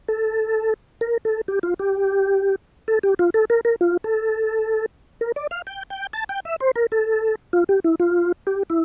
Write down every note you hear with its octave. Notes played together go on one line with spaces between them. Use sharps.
A4
A#4
A4
G4
F4
G4
A4
G4
F4
A4
A#4
A#4
F4
A4
A#4
D5
F5
G5
G5
A5
G5
E5
C5
A#4
A4
F4
G4
E4
F4
G4
E4